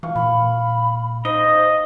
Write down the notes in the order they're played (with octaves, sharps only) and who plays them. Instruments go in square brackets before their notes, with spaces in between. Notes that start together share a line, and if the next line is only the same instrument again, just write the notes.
[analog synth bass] E3 [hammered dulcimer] F5 C#6
[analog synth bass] A#2 [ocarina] B5
[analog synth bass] D#4 [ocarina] C5 [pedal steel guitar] D#5